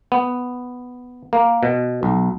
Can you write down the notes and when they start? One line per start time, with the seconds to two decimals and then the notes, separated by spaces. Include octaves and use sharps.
0.12 B3
1.33 A#3
1.63 B2
2.03 B1